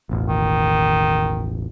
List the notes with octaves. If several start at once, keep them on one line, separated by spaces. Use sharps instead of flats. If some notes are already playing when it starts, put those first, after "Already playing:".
E1 A1
D#3